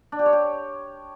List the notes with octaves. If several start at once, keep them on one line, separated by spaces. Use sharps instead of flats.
D4
G4
C#5
G4